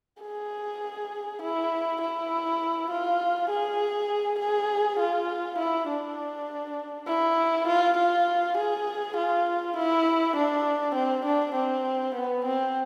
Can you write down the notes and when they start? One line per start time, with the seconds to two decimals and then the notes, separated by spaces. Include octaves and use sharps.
0.22 G#4
1.42 E4
2.01 E4
2.91 F4
3.50 G#4
4.39 G#4
5.00 F4
5.59 E4
5.88 D4
7.07 E4
7.68 F4
7.97 F4
8.58 G#4
9.17 F4
9.77 E4
10.37 D4
10.95 C4
11.25 D4
11.55 C4
12.15 B3
12.45 C4